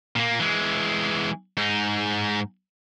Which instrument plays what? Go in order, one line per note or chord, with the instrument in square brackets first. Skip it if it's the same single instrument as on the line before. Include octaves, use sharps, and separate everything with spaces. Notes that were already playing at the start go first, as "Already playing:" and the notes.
[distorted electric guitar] A#2 A#3
E3 G#3
G#2 D#4